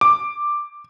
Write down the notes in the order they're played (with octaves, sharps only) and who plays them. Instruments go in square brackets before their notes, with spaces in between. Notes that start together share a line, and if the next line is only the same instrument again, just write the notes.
[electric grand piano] D6